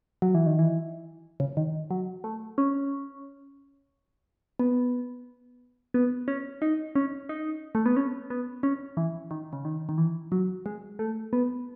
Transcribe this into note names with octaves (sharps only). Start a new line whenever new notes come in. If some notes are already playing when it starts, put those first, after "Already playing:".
F#3
E3
D#3
E3
C#3
D#3
F#3
A3
C#4
B3
B3
C#4
D#4
C#4
D#4
A3
B3
C#4
B3
C#4
E3
D#3
C#3
D#3
D#3
E3
F#3
G#3
A3
B3